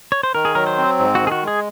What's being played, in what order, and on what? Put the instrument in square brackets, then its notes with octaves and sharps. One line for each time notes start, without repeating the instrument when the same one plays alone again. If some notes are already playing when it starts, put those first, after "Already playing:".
[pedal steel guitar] C#5
C5
[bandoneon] D#3 [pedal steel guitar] A#4
[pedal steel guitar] G#4
[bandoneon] F#3 [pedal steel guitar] A#4
[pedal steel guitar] C5
[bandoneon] C4
G#2
[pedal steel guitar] F#4
[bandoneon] D#3
[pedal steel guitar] G#4
F#4
[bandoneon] G#3 [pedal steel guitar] G#4